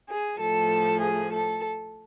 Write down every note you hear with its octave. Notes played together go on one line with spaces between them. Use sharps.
G#4
A2 F3 A3 A4
G#4
A4